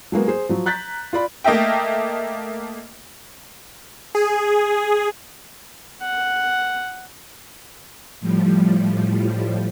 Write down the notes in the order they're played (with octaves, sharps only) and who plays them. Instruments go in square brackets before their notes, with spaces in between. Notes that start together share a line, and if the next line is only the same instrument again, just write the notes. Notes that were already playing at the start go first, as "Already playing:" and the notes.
[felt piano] F#3 G#3 A#3 B3
G#4 C5
F3 F#3
A#5 F#6 G6 A6 B6
F4 D5 B5
[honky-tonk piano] A3 A#3 D#5 E5 G5
[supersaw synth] G#4
[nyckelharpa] F#5
[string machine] A2 F3 G3